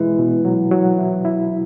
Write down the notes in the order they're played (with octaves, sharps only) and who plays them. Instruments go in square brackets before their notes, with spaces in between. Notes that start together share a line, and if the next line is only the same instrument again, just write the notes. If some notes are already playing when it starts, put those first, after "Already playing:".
Already playing: [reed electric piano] B2 G#3 E4 [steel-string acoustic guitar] E3
[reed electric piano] B2
F#3
F#3
E4
E4